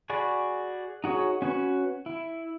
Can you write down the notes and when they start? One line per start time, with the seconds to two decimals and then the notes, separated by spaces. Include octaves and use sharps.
0.10 F#4 G#4 D5 B5
1.04 D#4 F#4 G#4 C#5
1.42 C#4 F#4 B4 C#5
2.06 E4